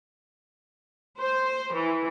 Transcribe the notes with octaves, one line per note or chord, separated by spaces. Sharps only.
C5
E3